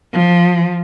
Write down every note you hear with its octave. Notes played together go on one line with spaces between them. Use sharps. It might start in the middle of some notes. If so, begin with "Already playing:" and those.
F3